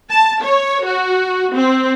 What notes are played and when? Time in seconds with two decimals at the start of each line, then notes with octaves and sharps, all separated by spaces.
0.10 A5
0.41 C#5
0.84 F#4
1.53 C4